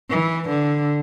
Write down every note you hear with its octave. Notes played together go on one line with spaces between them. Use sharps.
E3
D3